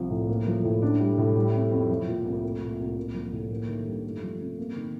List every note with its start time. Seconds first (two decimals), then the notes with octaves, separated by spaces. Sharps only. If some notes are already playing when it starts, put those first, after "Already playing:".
Already playing: C2 F3 C4
0.11 A2
0.28 A#3
0.47 F3
0.64 A2
0.82 D4
1.00 G3
1.18 A2
1.36 G3
1.54 C3
1.72 F2
1.89 F3
2.07 A#2
2.25 C2
2.43 A3
2.61 A#2
2.79 C2
2.97 A#3
3.14 F3
3.33 A2
3.51 A#3
3.68 D#3
3.86 G2
4.04 A3
4.22 F3
4.40 C3
4.58 A#3
4.76 D#3